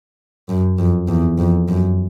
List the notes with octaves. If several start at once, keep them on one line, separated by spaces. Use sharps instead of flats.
F#2
F2
E2
F2
F#2